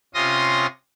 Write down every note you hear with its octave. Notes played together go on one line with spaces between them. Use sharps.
C3 C#4 F4 C6 D#6 A#6